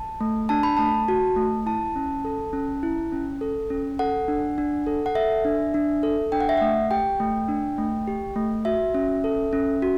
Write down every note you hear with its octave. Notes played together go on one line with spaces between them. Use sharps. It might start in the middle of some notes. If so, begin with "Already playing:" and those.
Already playing: A5
A3
D4 A5
B5
A3 A5
F#4
A3
E4 A5
C#4
A4
C#4
E4
C#4
A4
C#4
A4 F#5
D4
D4
A4
F#5
A4 E5
D4
D4
A4
D4 G5
F#5
E5
A3 F#5
G4 G5
A3
D4
A3
G4
A3
F#4 E5
C#4
A4
C#4
F#4